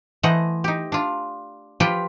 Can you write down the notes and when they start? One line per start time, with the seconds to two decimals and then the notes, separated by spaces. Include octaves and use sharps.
0.23 E3 A3 C5 D#5 F#5
0.64 D#4 G4
0.92 D4 F4
1.80 F3 F4 G4 B4 G5